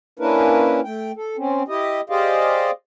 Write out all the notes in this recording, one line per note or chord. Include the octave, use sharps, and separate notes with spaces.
A#3 C#4 D4 E4 A#4 B4
A3 G5
A4
C4 C#4
E4 G4 D#5
G4 G#4 C5 D5 D#5 F5